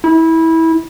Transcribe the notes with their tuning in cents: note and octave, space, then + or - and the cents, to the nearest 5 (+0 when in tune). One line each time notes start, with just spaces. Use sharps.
E4 -20